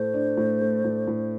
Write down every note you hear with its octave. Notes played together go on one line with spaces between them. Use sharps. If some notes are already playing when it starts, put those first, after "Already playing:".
Already playing: A2 A3 C5
D4
A2
A3
A2
A2